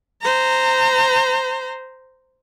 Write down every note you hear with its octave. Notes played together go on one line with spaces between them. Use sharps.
C5 A#5